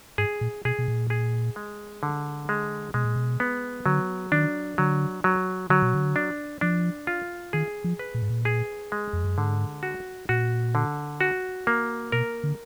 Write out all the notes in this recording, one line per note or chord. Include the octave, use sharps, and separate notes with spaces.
G#2 G#4
A#2
B2 G#4
B2
A#2
G#4
G#3
D3
G#3
B2 G#3
A#2
B2
B3
D3 F#3
D#3 D4
D3 F#3
F#3
D3 F#3
B2
D3
D4
F3 D4
F4
D#3 G#4
F3
B4
A#2
G#2
A#2
G#4
G#3
F2
F#2
G#2 D3
F#4
A#2 F#4
D3
F#4
A#3
B2 A#4
D3